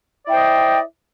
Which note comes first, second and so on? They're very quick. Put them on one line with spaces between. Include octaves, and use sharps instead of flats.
D5 E4 G5 C5 D#5